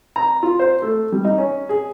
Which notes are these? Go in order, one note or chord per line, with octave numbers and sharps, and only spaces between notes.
A#5
F4
C5
A3
G3
D#4
C#4
G#4